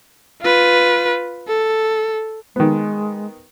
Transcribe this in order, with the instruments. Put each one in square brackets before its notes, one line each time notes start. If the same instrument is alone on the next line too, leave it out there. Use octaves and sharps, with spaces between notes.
[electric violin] F4 B4
A4
[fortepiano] D#3 B3 [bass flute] G#3